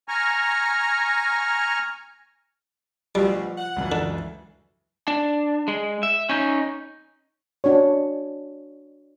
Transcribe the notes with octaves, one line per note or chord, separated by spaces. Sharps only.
G#5 A#5 C#6 F6
D2 B2 F3 G3
F#5
C#2 F#2 E3
D3
D4
G#3
E5
C#4 D#4
D4 F#4 C#5